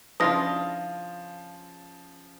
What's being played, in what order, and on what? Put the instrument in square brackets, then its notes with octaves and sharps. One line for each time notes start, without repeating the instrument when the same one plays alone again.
[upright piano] C#3 F3 [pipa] D4 E4 F4 [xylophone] D#6 A#6